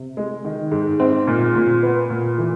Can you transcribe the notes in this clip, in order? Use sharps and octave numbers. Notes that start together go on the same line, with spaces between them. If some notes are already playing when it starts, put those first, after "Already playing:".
Already playing: C3
G#3
D#3
G#2
C4
A#2
A#2
B3
A#2
E3